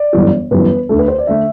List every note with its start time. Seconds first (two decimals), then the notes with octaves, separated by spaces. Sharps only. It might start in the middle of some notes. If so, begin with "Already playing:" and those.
Already playing: D5
0.13 G1 F#2 E3 G3
0.51 G1 F#2 E3 G3 B4
0.89 D2 D3 A3 A4
0.99 B4
1.08 C5
1.18 D5
1.27 D3 A3 E5